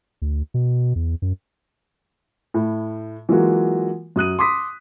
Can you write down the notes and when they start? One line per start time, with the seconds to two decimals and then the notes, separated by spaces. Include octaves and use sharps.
0.22 D2
0.54 B2
0.96 E2
1.22 F#2
2.54 A2
3.29 E3 F#3 G#3 A#3 F4 F#4
4.16 F#2 D#6 F#6 D#7
4.39 C6 D6 D#6 B6